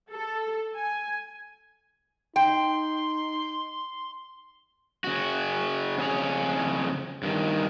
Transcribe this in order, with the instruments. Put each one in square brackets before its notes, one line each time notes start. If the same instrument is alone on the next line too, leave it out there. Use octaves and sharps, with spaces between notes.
[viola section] A4
G#5
[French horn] D#4 [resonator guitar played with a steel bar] G5 [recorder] C6
[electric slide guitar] C#3 F#4
F2 C#3 G#4 C#5
G2 D#3